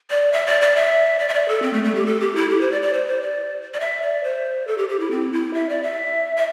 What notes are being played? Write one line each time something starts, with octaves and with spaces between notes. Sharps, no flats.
D5
E5
D5
D5
E5
D5
E5
D5
A4
C4
A3
A3
G4
A4
G4
E4
G4
C5
D5
D5
C5
C5
D5
D5
E5
D5
C5
A4
G4
G4
E4
C4
E4
E5
D5
E5
E5